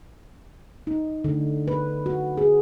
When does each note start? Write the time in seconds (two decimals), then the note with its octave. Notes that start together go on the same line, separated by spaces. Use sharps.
0.87 D#4
1.24 D3
1.68 B4
2.06 F#4
2.37 G#4